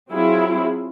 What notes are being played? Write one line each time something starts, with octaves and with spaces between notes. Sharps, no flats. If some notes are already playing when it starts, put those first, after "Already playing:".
F#3 C4 E4 F4 G#4